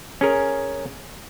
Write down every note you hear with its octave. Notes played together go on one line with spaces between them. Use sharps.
C#4 G#4 A#4